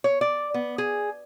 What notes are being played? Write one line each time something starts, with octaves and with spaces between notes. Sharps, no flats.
C#5
D5
B3
G#4